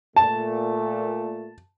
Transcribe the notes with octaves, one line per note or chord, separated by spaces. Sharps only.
A#2 A3 A5